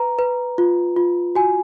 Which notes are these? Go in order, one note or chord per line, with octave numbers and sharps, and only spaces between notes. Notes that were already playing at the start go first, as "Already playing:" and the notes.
Already playing: B4 A#5
B4
F4
F4
F#4 G#5